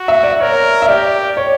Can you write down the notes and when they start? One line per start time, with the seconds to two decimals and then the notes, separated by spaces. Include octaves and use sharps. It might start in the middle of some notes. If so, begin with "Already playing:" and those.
Already playing: F#4
0.08 E5
0.23 D5
0.40 A#4 C#5
0.82 E5
0.89 G4 D5
1.37 C#5